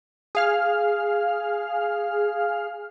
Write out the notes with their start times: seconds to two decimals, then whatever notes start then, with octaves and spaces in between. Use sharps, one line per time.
0.35 G#4 F5 F6